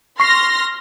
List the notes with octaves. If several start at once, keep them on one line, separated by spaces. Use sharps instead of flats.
C6 C#6 F6 A#6 C7